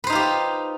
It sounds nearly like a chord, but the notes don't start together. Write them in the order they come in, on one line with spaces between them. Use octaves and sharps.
B4 C5 D#4 F4 G4